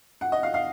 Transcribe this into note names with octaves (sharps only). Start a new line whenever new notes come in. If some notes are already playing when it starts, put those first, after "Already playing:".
F#5
D#5
F5
F5